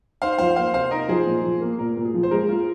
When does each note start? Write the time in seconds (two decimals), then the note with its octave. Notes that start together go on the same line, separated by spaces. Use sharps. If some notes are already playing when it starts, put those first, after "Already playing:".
0.22 D#4 C5 F5
0.39 F3 C5 F5
0.56 A#3 C5 F5
0.74 C3 C5 F5
0.91 D#4 A#4 D#5
1.08 F3 G#4 C5
1.26 A#2
1.44 F3
1.61 A#3
1.78 A#2 A#4
1.97 A#2
2.05 G#4
2.14 F3
2.23 C5
2.31 G#3 A#4
2.49 F4